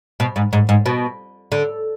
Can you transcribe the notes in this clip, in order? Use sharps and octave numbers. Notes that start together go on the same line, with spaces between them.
B2
G#2
G#2
G#2
B2
D3